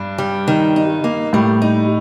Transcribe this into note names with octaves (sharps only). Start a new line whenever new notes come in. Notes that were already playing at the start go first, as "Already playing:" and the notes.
Already playing: G2 D4
G3
D#3
D#4
A#3
A2 G3
D#4